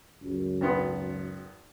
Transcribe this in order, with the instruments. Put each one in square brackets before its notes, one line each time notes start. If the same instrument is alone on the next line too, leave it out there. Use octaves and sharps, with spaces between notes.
[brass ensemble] C#2 F#2
[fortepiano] G#1 B3 C6